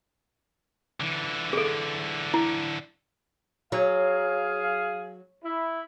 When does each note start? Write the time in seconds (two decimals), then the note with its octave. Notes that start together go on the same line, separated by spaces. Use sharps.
1.00 D3 E3
1.53 G#4 A4
2.34 E4
3.72 F#3 G#4 F5
5.44 E4